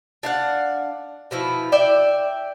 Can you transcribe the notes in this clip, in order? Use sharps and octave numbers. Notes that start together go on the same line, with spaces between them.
D4 F5 F#5
B2 F3 E4
D5 E5 G5